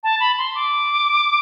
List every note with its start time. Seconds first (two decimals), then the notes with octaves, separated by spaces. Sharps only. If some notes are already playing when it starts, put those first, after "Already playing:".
0.03 A5
0.20 B5
0.38 C6
0.55 D6